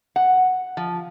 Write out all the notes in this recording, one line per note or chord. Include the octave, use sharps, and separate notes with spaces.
F#5
F3